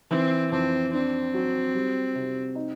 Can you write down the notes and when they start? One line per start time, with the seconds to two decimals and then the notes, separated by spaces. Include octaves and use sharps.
0.10 E3 C4
0.51 F2 C4
0.93 C4 D4
1.34 F#3
1.74 G3
2.15 C3
2.55 D#4